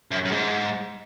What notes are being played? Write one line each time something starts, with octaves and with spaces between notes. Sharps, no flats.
F#2
F#2
G#2